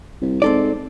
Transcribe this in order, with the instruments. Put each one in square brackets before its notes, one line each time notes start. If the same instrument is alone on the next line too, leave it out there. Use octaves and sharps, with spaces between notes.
[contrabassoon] C2
[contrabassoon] G#2 [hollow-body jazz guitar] C4 A4 D5